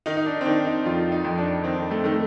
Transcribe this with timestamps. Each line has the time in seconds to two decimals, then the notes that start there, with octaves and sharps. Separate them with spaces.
0.06 D#3 D#4
0.17 D#4
0.26 D4
0.41 C4
0.45 D#3 D4
0.66 D#4
0.85 F2 F4
1.12 D#4
1.25 F2
1.38 D4
1.64 D#3 C4
1.91 A3
2.04 D#3 A3